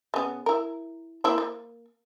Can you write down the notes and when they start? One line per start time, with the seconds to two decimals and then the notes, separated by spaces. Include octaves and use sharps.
0.14 C#3 B3
0.46 E4 A#4
1.24 A#3 E4 C5
1.38 A#3